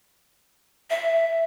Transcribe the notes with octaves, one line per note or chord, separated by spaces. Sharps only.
E5